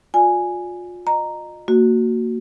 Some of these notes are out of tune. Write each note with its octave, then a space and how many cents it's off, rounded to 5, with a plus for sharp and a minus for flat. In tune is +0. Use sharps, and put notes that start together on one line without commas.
F4 +30 D5 +0 G#5 +0
D#5 -25 A#5 +0
A#3 -20 F#4 +0